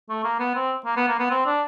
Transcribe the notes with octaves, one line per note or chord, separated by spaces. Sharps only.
A3
A#3
B3
C4
A#3
B3
A#3
B3
C4
D4